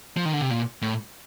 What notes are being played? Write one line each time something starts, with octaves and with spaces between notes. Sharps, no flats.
F3
D#3
D3
C3
A#2
A2